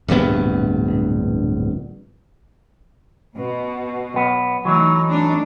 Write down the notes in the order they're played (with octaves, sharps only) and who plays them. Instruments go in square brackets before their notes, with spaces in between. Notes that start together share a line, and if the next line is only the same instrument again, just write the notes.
[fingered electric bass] D1 A#1 G2 B3
[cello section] B2
[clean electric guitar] B1 B3
[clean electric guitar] E3 F#3 [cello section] A3 D#4
[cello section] A3 D4 D#4